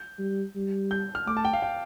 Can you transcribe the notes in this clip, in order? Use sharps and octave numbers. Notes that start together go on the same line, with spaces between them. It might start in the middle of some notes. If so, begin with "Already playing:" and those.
Already playing: G6
G3
G3
G6
F6
A3 D6
A5
G5
F5
G5